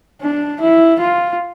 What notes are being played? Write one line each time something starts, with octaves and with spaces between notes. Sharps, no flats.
D4
E4
F4